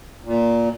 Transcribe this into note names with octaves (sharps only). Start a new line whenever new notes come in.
A#2